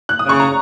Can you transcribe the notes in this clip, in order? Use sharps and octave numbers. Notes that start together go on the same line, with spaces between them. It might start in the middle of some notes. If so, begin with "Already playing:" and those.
F#6
D#6
C#3 C#6
A#5